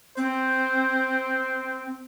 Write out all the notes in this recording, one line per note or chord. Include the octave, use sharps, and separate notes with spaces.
C4 C5